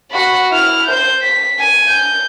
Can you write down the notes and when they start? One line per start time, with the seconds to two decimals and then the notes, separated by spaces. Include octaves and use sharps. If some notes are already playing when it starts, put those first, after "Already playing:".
0.11 F#4 B5
0.51 E4 F6
0.87 C5 G6
1.22 B6
1.59 G#5
1.88 G6